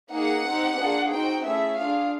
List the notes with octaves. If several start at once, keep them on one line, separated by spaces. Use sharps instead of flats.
A#3 D#4 G#4 F#5
C4 D#4 G4
A#3 D4 F4 G#4
C4 D#4 F#4 G5
A3 C#4 E4 G#4 E5
D4 F4 G#4 F5